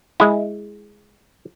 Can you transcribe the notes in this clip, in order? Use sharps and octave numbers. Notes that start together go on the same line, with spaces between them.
G#3 E4